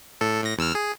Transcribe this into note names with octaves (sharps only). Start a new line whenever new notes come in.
A2 A4
A2 A#6
E2 E6 F6
G#4